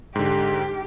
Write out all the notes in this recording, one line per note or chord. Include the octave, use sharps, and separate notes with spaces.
G#2 D3 G4